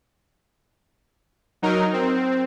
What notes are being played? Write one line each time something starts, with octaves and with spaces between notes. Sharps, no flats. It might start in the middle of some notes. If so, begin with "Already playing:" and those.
F#3 D#4 A#4
C4